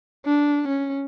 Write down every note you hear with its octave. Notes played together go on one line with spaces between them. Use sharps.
D4
C#4